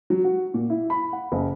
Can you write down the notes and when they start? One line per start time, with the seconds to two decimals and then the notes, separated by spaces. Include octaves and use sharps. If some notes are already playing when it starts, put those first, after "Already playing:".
0.10 F#3
0.24 F#4
0.54 A#2
0.70 E4
0.90 B5
1.13 F#5
1.32 F#1